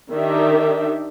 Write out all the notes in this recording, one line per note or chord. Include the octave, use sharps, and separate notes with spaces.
D#3 D4 D#4 G4 E5